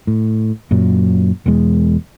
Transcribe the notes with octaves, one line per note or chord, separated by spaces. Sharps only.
A2
F#2 A#2 F#3
E1 E2 G#3